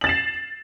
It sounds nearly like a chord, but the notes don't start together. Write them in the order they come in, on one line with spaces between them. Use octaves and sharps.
F#7 A6 E7 C7